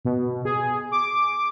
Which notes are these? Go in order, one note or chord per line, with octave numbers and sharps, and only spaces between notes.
B2
G#4
D6